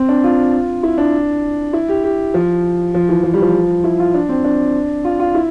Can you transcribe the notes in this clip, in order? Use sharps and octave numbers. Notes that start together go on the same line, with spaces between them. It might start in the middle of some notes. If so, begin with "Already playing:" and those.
Already playing: C4
D4
F4
E4
D4
E4
G4
G4
F3
F3
E3
F3
G3
F3
E4
F4
D4
C4
D4
F4
F4
E4